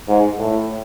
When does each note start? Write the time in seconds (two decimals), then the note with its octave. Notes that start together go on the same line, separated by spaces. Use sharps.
0.08 G#2
0.39 A2